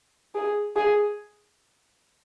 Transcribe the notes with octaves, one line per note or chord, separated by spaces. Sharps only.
G#4
G#4